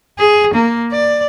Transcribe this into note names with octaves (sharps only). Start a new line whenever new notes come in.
G#4
A#3
D5